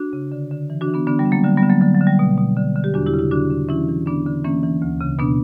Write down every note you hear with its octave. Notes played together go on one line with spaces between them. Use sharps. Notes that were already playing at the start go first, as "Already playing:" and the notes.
Already playing: D4 F#4
C#3
D3
D3
E3
D4 F#4
E3
B3 D4
D3 B3 D4
G3 B3
D3
F#3 A#3
D3 G3
G3 B3
D3
F#3 A#3
D3 F#3
F#3
D3
G3
B2
B2
D3
D3
G4
E2 D4 F#4
E4 G4
C#3
E4 G4
D3 D4 F#4
D3
E3 C#4 E4
E3
D3 B3 D4
D3
E3 A#3 C#4
E3
D2
C#3
B2 B3 D4